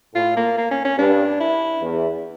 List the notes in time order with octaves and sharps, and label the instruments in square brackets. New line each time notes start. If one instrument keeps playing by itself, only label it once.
[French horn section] A2 [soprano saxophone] F4
[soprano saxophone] A#3
A#3
C#4
C#4
[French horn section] G2 [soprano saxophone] D4
[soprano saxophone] E4
[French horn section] E2